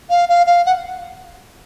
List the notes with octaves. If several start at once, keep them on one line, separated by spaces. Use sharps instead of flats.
F5
F5
F5
F#5